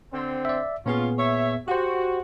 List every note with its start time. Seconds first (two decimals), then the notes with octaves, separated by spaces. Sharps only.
0.13 D3 C4
0.45 D5 E5
0.86 A#2 B3 C#4 F4 G#4
1.18 C#5 E5
1.68 F#4 G4 C5